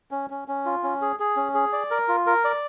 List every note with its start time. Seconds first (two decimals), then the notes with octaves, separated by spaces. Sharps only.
0.11 C#4
0.30 C#4
0.48 C#4
0.65 F4
0.83 C#4
1.02 G#4
1.20 G#4
1.36 C#4
1.54 G#4
1.73 D5
1.91 A#4
2.08 F4
2.27 A#4
2.44 D5